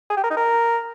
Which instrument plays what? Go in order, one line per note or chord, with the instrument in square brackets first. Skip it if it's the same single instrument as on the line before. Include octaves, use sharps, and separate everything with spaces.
[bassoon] G#4
G4
A#4
D#4
A#4